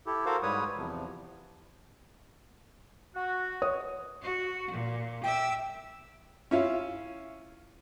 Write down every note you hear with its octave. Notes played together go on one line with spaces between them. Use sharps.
E4 G4 A4
F#4 A4 A#4 C5 F5
G#2 G3 B4 C#5 D#6
E2 C3 F3
F#4
C#5 D#6
F#4
A#2
E5 G5 D6 E6
C#4 E4 F4